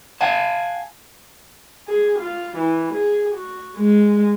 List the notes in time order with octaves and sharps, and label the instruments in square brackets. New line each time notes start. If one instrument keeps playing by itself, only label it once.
[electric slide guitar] F5 G#5 A5 [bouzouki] F#5
[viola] G#4
F4
E3
G#4
F#4
G#3